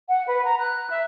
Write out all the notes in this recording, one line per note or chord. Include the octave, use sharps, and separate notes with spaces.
F#5
B4
A#5
F#6
E5